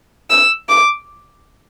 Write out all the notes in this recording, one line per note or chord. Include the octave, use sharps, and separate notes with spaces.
E6
D6